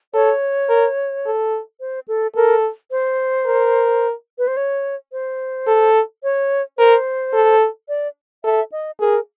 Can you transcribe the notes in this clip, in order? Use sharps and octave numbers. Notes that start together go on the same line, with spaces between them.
A4 C#5
A#4
A4
C5
A4
A4 A#4
C5
A#4
B4
C5
C#5
C5
A4
C#5
A#4 C5
A4
D5
A4 E5
D#5
G#4 A#4